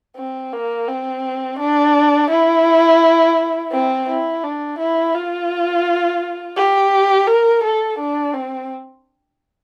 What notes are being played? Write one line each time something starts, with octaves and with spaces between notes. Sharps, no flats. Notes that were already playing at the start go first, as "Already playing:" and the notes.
C4
A#3
C4
D4
E4
C4
E4
D4
E4
F4
G4
A#4
A4
D4
C4